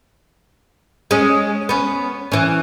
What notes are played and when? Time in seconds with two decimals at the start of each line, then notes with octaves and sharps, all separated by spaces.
1.11 G#3 C#4 G#4
1.69 B3 C#4
2.32 E3 C#4